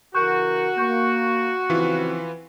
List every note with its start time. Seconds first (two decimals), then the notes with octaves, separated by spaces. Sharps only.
0.15 C#3 E3 F#4 A#4 C#6 F#6 G6
0.78 A#3 C#6 G6
1.70 C#3 E3 F3 C4 F4 B4